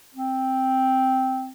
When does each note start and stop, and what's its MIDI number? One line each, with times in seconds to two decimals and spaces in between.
0.15 1.52 60